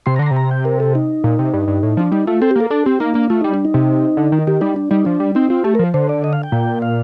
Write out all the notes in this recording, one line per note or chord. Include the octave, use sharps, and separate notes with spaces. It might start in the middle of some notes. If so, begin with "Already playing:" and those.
C3 C6
A#5
D3 C6
A#5
C3
A#5
G5
A#4
A4
D#4
A#2
C3
G2
G2
A2
F3 D4
G3 D#4
A3 F4
C4 A4
G4
A#3 A4
D4 A4
C4 G4
A#3 D#4
A#3 D4
A3 F4
G3 D#4
D4
D#4
C3
D3
D#3
D#3 G4
G3 D#4
D4
G3 D#4
F3 D4
G3
C4 D#4
C4 F4
A3 G4
A#4
F3
D3 C5
D5
D#5
F5
G5
A#2
F5